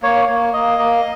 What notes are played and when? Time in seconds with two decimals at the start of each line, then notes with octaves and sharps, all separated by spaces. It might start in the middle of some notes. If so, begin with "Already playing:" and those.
0.02 A#3 C#5
0.29 A#3
0.53 A#3 D#5
0.79 A#3